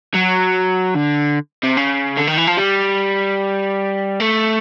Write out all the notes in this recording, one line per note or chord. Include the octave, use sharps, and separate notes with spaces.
F#3
D3
C3
C#3
D3
D#3
E3
F3
G3
A3